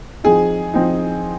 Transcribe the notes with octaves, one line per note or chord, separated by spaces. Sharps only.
F3 C4 D#4 G#4
F3 C4 D#4